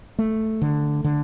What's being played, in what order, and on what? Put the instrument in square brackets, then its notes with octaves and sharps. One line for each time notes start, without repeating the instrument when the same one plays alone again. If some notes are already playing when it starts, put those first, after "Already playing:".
[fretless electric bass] A3
D3
D3